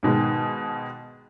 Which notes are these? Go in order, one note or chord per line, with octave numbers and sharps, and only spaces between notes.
G#2 B2 D#3 G#3